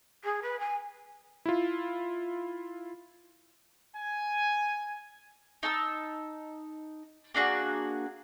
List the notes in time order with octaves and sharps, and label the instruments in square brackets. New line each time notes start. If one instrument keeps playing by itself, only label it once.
[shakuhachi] G#4
B4
G#5
[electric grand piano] E4 F4
[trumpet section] G#5
[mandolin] D#4 A5 E6
A#3 D4 F#4 G#4